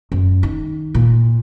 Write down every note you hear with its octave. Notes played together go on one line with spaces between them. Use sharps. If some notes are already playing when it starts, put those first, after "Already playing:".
F#2
D#3
A#2